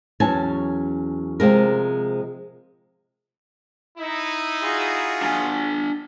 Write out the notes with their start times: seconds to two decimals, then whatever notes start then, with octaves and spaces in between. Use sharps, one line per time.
0.20 E2 F#3 C#4 G#5 A5
1.40 C3 F3 G#3 A#4
3.98 D#4 E4
4.63 F4 F#4 G#4
5.22 D4 G5 G#5